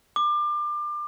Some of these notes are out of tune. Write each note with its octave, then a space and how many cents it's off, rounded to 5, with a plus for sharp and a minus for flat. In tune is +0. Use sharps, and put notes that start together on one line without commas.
D6 +30